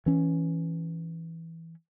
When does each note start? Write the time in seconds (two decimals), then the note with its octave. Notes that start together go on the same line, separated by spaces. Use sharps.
0.06 E3 C#4